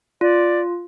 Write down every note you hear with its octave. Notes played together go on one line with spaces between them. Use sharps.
F4 D5